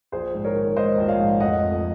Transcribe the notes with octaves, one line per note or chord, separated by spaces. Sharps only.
A#1 G#4 C5
G#2
A#4 C#5
D#3
G#3 C5 D#5
A#1
C#5 F5
G#2
F1 D#5 F#5
F2